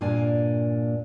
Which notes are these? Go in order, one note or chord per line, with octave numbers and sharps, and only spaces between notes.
G2 A#2 A#3 D4 G#5